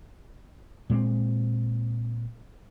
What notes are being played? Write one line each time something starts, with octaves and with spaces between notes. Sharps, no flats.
A#2 G#3 A3 C4